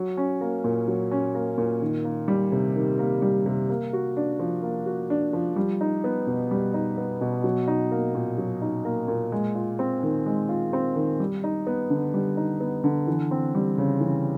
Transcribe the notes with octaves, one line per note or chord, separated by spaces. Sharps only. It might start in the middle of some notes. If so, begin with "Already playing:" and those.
Already playing: F#3
C#4
A#3
A#2
F#3
C#4
A#3
A#2
D#3
A#3
G3
C3
D#3
A#3
G3
C3
A#3
F#4
D4
F3
A#3
F#4
D4
F3
G3
D#4
B3
B2
G3
D#4
B3
B2
F#3
D#4
A#3
A#2
F#3
D#4
A#3
A#2
G#3
F4
C4
D#3
G#3
F4
C4
D#3
G3
D#4
B3
D3
G3
D#4
B3
D3
E3
C4
G3
C#3
E3